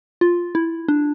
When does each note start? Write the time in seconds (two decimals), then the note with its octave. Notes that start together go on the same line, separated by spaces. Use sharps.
0.21 F4
0.55 E4
0.88 D4